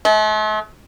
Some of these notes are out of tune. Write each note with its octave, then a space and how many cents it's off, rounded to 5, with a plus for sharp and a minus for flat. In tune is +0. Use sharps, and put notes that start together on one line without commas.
A3 -45